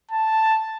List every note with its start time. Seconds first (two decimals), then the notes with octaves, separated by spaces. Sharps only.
0.12 A5